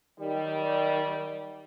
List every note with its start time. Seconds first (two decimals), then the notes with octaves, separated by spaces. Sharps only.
0.19 D#3 F#3 G3